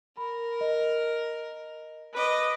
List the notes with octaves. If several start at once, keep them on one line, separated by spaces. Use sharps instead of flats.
A#4 B5
D#5
B4 D#5 D6